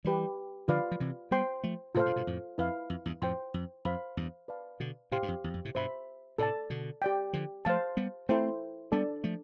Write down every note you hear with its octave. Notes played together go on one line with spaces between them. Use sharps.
E3 G3 G4 B4 D5
D3 F3 F4 B4 D5 F5
F3
C3 E3
G3 B3 C5 G5 C6
F3 A3
A2 C3 F4 A4 C5 F5
G2 B2
G2 B2
F2 A2
F2 E4 B4 F5
F2
E2 G2
F2 A2 C5 G5 C6
F2
F2 C5 F5 B5
E2 G2
B4 D5 F5 A5
B2 D3
A2 C3 G4 C5 F5 C6
G2
F2
E2
F2
A2 C3
G2 B2 C5 E5 B5
A2 C3 A4 D5 A5
B2 D3
G4 D5 G5
D3 F3
F3 A3 C5 F5 A5
G3 B3
A3 C4 E4 A4 C5 G5
G3 B3 D4 A4 D5 A5
F3 A3